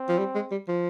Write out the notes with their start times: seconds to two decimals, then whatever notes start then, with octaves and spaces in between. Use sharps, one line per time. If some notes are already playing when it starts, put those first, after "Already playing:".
Already playing: C4
0.09 F3
0.19 G3
0.35 G#3
0.51 G3
0.68 F3